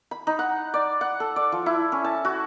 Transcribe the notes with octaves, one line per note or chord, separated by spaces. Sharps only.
B5
D#4
F#5
D5
F#5
A4
D5
F3
E4
C#4
A5
F#4